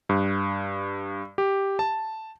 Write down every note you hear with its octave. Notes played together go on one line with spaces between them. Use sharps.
G2
G4
A5